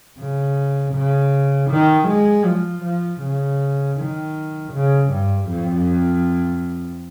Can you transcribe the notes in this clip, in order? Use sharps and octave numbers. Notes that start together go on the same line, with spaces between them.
C#3
C#3
D#3
G#3
F3
F3
C#3
D#3
C#3
G2
F2